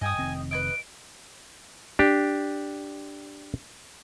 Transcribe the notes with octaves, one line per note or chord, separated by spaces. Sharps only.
G2 D#5 G5 G#5 D#6
F1 D#3 C4
B4 C#5 D#5 D7
D4 G4